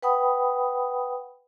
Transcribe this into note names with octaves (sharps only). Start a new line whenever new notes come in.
B4 F#5 G5 B5 D#6